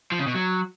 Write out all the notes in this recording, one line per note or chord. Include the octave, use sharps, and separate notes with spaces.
F3
C#3
B2
F#3